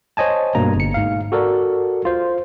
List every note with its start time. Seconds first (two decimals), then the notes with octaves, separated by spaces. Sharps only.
0.17 C5 C#5 D#5 G#5 A5
0.55 G2 B2 A#3 A#5
0.76 G1 C#7
0.94 G#2 F5
1.32 F#4 A4 A#4 D5
2.05 F4 C5